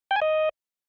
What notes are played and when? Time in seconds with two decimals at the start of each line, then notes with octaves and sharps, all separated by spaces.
0.11 G5
0.16 G#5
0.22 D#5